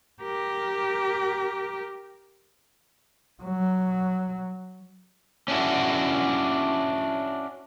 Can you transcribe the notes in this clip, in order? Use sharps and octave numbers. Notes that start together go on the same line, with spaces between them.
G4 A#4
F#3
C#4 D4 E4 F#4